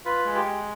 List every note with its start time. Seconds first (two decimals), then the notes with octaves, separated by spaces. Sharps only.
0.05 F4 B4
0.25 G#3
0.35 G4
0.45 G#3